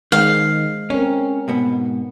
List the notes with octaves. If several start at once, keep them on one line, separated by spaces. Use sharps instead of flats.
D#3 G#3 C5 F5
C4 C#4 A#4
G#2 B2 B3